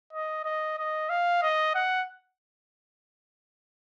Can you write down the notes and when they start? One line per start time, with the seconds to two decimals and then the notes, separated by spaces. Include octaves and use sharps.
0.13 D#5
0.45 D#5
0.78 D#5
1.10 F5
1.42 D#5
1.75 F#5